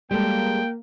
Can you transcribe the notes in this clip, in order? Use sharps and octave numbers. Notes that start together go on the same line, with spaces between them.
G3 G#3 A#3 A4 G5